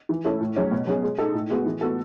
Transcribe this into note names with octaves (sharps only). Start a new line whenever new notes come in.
E3
A3 C#4 E4
A2
F#3 C#4 G#4
B2
F#3 C#4 G#4
G#3
D#4 A4
A2
G#3 B3 F#4
E3
B3 F#4 A4